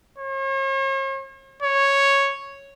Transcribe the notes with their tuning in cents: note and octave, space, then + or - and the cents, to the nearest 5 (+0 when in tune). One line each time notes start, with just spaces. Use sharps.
C#5 -45
C#5 -5